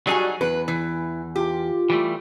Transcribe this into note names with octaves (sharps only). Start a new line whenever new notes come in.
F#3 G3 D#4 F#4 G#4 G#5
E2 B4
E3
F4 G4
E3 G3 A3